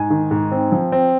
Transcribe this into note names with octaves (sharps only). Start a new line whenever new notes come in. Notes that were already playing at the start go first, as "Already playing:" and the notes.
Already playing: G#2 G#5
D#3
G#2
C4
F3
C4